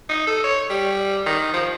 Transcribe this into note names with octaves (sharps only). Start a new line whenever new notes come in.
D#4
A4
C#5
G3
D#3
F3